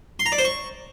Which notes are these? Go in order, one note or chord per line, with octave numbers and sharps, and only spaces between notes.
C6
A#5
D5
C5
C#6